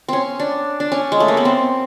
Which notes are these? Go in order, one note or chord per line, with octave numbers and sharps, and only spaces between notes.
C4 C#4
D4
D4
C#4
G#3
A3
A#3
B3
C4